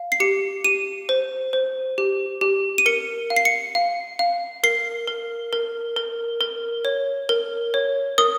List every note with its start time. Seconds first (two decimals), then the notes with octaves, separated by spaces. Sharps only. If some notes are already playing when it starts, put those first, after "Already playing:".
Already playing: F5
0.12 C7
0.20 G4 C#7
0.64 G4 D#7
1.09 C5
1.53 C5
1.98 G4
2.41 G4
2.78 D#7
2.86 A#4 C#7
3.30 F5
3.36 C7
3.45 C#7
3.75 F5
4.19 F5
4.63 A#4 C7
5.08 A#4
5.53 A#4
5.96 A#4
6.41 A#4
6.85 C#5
7.29 A#4
7.74 C#5
8.18 A#4 D#6